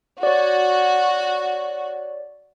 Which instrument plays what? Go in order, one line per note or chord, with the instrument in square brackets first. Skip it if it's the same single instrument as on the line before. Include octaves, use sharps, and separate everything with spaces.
[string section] F#4 [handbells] C#5 D5